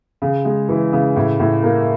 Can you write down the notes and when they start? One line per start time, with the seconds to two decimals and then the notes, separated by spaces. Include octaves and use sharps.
0.22 C#3
0.45 G#3
0.69 E3
0.93 C#3
1.16 A2
1.40 A2
1.63 A#3